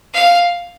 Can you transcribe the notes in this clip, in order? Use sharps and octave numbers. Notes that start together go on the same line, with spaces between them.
F5